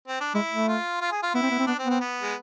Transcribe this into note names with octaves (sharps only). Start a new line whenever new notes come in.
C4
D4
G#3 E4
A3
F4
F4
G#4
F4
B3 E4
C4
B3
C4
B3 D4
C4
B3
C4
B3
G#3